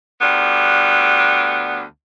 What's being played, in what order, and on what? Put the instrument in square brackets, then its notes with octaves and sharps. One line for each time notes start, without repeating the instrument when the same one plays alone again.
[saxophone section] D2 G3 B3